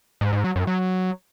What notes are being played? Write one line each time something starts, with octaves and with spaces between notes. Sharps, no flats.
G#2
G#2
F#3
F#2
F#3